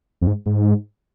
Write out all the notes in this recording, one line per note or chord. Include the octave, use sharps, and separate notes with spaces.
F2
G#2
G#2